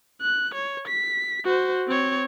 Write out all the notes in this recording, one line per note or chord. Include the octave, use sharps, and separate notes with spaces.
F#6
C#5
B6
F#4 C5
C4 C#5